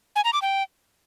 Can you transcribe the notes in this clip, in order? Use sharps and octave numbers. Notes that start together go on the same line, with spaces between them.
G#5
A#5
D6
G5